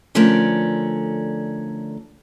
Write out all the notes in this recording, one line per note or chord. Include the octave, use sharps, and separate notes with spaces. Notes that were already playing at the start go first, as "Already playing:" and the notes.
D3 F3 A3 C#4 A#4 D5